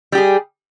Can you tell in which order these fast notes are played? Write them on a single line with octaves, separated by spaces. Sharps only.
G3 G4 G#4